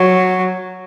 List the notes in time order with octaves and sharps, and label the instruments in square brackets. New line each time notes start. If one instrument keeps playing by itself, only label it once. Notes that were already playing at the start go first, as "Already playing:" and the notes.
Already playing: [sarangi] F#3